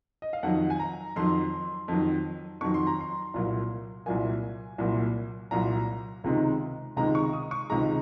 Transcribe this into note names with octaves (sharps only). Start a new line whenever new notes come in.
D#5
F5
F2 D#3 F#3 F#5
G#5
A#5
F2 D#3 F#3 C6
F2 D#3 F#3
F2 D#3 F#3 C#6
C6
A#5
C6
C2 A#2 F#3 A#3
C2 A#2 F#3 A#3 G#5
C2 A#2 F#3 A#3
C2 A#2 F#3 A#3 A#5
C#2 C3 D#3 G#3
C#2 C3 D#3 G#3 A#5
C#6
D#6
C#6
C#2 C3 D#3 G#3 A#5